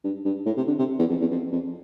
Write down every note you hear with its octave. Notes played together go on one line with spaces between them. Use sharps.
G2
G2
A2
C3
D3
C3
E2
F2
E2
F2
F2